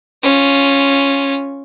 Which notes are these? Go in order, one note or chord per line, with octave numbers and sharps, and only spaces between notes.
C#4 F4